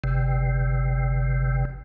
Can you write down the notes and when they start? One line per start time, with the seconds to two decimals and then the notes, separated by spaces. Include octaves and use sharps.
0.04 G1 C3